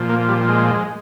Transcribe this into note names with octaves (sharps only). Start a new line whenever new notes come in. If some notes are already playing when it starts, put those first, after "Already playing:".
Already playing: A#2 F3
A#3
G3
G#3